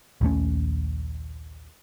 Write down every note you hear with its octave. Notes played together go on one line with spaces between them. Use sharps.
A#1 D#2 A3 C#4